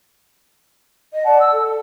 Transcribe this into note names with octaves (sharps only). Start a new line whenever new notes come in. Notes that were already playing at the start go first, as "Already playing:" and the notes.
D#5
D5 F#5 A5
E6
A4